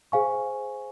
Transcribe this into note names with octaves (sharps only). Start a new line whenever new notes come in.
G#4 C5 F5 G#5 C#6